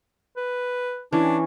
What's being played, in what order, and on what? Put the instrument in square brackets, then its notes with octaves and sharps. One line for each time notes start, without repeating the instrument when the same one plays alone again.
[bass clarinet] B4
[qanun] E3 C#4 [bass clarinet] D4